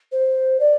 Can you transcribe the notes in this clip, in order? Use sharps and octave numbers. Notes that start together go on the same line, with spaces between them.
C5
D5